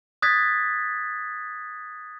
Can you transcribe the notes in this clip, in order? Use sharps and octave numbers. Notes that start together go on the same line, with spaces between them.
D#6 F#6 G#6 A6 B6